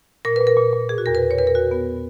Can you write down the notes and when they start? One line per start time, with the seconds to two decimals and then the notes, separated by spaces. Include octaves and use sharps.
0.25 A#2 A#4
0.36 A#2 B4
0.47 A#4
0.57 A#2
0.73 A#2
0.89 B2 G#4
0.98 F#4
1.06 E2 A#4
1.15 B4
1.22 E2
1.31 C#5
1.38 E2 B4
1.47 A#4
1.55 E2 F#4
1.71 B3